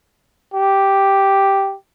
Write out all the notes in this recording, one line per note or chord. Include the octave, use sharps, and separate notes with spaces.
G4